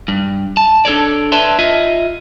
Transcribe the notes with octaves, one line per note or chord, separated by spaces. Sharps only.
G2
A5
D4 A4 C#5 D5
B4 C#5 D5 E5 A5 C6
F4 D#5 E5